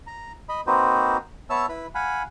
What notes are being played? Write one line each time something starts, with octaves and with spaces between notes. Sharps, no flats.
A#5
D#5 B5
A#3 C4 D#4 F#4 B4 C5
B3 C#5 E5 A5 E6
E4 B4 B5
F5 F#5 G#5 B5